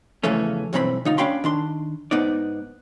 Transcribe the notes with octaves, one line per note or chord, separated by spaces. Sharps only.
E2 C#3 E3 F3 A3 C#4
B1 G2 E3 C4 A#5 B5
D3 D#4 F4
C#4 D4 F5 G5 B5 C6
D#3 D4 C6
G#2 B3 D#4 D5